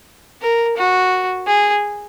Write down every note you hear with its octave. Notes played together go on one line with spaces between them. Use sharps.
A#4
F#4
G#4